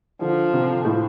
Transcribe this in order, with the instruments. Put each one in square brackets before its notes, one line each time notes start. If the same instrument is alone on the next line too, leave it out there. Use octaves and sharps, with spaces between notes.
[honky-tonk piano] D3 [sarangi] F3
[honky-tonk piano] C3
A2